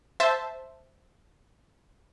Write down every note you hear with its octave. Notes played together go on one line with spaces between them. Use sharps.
C5 E5 A5